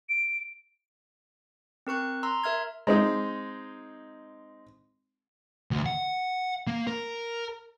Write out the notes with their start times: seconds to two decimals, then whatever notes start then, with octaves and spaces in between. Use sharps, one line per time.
0.09 D7
1.87 C4 A#4 C#6 F#6
2.23 A#5 C6 E6
2.44 A#4 E5 F6 G#6
2.87 G#3 C4 D#4
5.71 D2
5.86 F#5
6.67 A#3
6.87 A#4